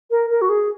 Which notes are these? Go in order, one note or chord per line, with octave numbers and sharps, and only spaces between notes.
A#4
A#4
F#4
G#4